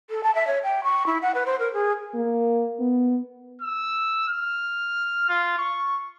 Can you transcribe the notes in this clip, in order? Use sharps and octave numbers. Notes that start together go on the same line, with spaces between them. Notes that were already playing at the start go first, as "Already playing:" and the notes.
A4
A5
E5
C#5
G5
C#6
E4
F#5
B4
C5
A#4
G#4
A#3
B3
E6
F6
F4
C#6